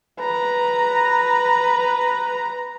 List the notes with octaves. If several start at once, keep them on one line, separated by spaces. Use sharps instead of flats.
B4 A#5